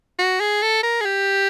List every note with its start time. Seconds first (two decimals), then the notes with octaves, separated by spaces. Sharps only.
0.19 F#4
0.40 G#4
0.62 A4
0.83 A#4
1.01 G#4
1.05 G4